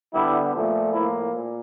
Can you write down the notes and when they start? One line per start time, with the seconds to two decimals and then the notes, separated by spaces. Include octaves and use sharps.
0.14 D3 G3 B3 E4
0.53 A#2 F3 A3
0.93 A2 F3 A#3 E4
1.32 A#2